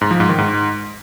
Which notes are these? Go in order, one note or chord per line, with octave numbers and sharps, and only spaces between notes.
G#2
F3
G#2
D#3
G#2